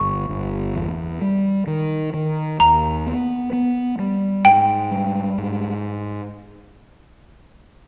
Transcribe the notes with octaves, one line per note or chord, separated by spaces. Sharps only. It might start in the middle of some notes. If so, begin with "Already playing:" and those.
Already playing: G1 C#6
G1
E2
G3
D#3
D#3
D#2 A#5
B3
B3
G3
G#2 G5
G3
G#2